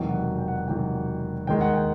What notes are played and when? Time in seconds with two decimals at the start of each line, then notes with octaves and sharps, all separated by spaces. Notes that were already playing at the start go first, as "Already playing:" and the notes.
Already playing: E1 E2 C3 D#3 F#3 G5
0.09 F#5
0.38 G5
0.48 F#5
0.68 E1 E2 C3 D#3 F#3 G5
1.47 D#2 D#3 G#3 G5
1.61 F#5
1.74 G5